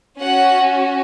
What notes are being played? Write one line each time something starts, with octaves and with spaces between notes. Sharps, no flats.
C#4 F#4 F#5